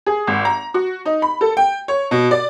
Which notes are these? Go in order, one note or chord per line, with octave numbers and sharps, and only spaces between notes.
G#4
G#1
A#5
F#4
D#4
B5
A4
G5
C#5
B2
D5